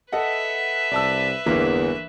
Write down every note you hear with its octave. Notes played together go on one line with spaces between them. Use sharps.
A4 B4 D#5 E5 F#5
C2 D5 A5 E6
G1 E2 E3 A#3